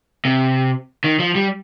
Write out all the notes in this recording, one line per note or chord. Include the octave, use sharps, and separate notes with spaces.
C3
D#3
F3
G3